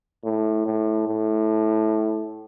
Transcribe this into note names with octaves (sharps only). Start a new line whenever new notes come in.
A2
A2
A2